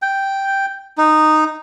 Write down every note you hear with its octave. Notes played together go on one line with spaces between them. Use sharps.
G5
D#4